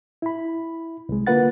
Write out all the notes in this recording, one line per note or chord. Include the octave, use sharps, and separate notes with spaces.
E4 B5
C2 G#3
D3 A#3 F4 B4 F#5 A6